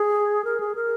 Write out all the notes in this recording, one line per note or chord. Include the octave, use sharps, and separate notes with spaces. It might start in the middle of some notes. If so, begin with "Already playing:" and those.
Already playing: G#4
A#4
G#4
A#4